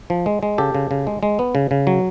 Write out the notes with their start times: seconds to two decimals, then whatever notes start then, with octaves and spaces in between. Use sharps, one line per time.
0.10 F3
0.26 G#3
0.43 G#3
0.58 C#3 G4 A4
0.75 C#3
0.91 C#3
1.07 G#3
1.23 G#3
1.39 B3
1.55 C#3
1.71 C#3
1.87 F#3